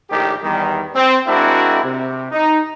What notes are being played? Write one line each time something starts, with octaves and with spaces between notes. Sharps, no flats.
A#1 A2 D#3 G4
E2 D#3 G3
C4
G#3 C4 D4 E4 F#4 A#4
C3
D#4